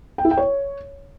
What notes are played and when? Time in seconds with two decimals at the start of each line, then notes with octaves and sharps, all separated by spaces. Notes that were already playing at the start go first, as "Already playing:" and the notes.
0.18 G5
0.25 E4
0.31 G5
0.38 C#5